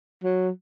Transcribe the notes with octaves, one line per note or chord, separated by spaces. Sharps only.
F#3